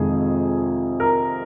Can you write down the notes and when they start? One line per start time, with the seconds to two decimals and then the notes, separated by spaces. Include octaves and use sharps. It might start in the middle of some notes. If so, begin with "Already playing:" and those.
Already playing: F2 C3 D#3 G#3 G#4
1.00 A#4